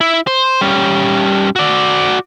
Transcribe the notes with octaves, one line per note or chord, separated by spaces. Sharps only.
E4
C5
G3 C#4
F#4 D5